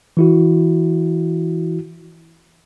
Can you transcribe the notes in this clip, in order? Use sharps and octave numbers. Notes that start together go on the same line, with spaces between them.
E3 E4 F#4